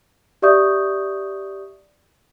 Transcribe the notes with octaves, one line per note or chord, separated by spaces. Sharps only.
G4 D5 E5 C#6 D#6 G6